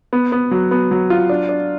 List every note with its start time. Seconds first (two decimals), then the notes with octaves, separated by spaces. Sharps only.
0.13 B3
0.32 B3
0.51 F#3
0.71 B3
0.91 F#3
1.10 F4
1.30 D4
1.49 D4